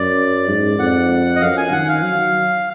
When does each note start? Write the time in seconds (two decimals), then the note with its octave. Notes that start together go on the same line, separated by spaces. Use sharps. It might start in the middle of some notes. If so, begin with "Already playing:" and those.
Already playing: F#2 D5
0.48 G#2
0.79 F2 F#5
1.36 D#5
1.41 F#2 F5
1.57 G#5
1.72 D#3 F#5
1.88 F5
2.04 F#3